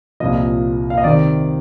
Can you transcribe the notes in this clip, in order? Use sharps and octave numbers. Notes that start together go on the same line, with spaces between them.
C2 A#2 F3 D#5
F5
D#5
C3 D#3 D5